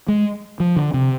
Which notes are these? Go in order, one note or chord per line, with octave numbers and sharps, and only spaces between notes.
G#3
F3
D3
C3